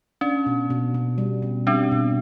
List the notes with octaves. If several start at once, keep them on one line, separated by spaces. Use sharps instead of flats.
C#4 D4
B2
B2
B2
G3
B2
G3 C4 D4
B2